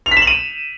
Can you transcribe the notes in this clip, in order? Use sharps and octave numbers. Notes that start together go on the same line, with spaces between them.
F7
B6
E7
F#7
D#7